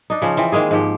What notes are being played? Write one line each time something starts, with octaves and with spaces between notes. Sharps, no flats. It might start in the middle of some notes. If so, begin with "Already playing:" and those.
D4 D#4
C#3 F3 C#4
E3 C4
D#3 G#3 A#3 G#4
G#2 F3 G4